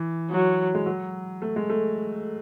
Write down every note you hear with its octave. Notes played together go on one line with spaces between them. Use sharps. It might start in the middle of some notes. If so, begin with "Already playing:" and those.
Already playing: E3
F#3
G#3
F#3
A3
G#3
A3